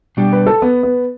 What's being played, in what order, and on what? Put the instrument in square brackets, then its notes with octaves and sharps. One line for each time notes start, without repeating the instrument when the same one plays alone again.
[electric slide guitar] B2 G3 D4 G4
[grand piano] B4
A4
B3
B3